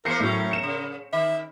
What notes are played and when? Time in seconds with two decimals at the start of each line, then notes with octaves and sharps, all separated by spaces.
0.05 E3 A#3 A#4 C5 A#6 C7 C#7
0.20 A2 F#3 A3 C#4
0.51 C#7 E7
0.63 C#3
1.13 D#3 E5